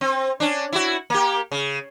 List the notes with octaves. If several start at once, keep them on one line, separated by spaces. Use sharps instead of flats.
C4
C#4 D4
E4 F#4
A#3 G4
C#3